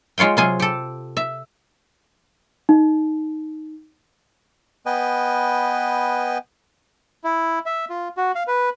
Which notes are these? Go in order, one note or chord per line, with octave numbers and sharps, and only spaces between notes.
G#3 F4 C#5 F5 G5
C3 F#3 F4 G#4 G#5
G4 A4
E5
D#4
B3 B4 D#5 G5 G#5
E4
E5
F4
F#4
F5
B4